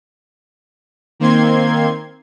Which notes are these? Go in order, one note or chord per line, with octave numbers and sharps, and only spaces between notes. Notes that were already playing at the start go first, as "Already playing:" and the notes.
D#3 A#3 C4 C6 G#6